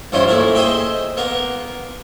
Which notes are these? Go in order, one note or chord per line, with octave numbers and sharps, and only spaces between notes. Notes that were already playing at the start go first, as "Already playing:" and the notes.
G2 F3 C#4 D#4 E4 C5
A#2 A3 E4 A#4
G#4 C5 D#5 E5 G5
A#3 B3 A#4